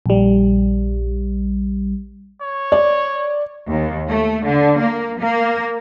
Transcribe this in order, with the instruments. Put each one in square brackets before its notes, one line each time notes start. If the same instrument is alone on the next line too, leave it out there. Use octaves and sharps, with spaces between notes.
[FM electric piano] A#1 G3
[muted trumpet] C#5
[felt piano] D5
[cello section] D#2
A3
D3
A#3
A#3